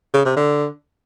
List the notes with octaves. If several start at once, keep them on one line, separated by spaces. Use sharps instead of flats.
C#3
C3
D3